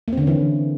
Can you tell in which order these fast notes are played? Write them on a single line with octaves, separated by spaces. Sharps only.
A#3 C4 D3 C#4 E3